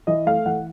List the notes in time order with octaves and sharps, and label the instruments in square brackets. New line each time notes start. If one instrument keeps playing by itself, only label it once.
[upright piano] E3 D#5
A3 F5
E3 F#5